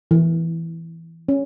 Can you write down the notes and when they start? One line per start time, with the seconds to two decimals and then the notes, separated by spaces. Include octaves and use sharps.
0.11 E3
1.29 C#4